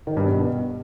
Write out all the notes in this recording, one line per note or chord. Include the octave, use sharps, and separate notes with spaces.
D#3
G2
B2